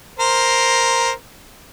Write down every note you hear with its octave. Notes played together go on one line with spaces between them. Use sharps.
A#4 C5